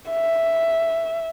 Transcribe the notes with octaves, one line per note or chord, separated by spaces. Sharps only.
E5